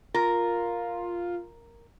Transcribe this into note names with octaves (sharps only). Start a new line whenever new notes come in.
F4 A#4